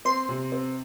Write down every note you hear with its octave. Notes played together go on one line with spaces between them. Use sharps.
C4 C6
C3
C4